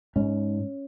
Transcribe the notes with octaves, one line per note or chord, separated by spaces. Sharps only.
G#2 C#4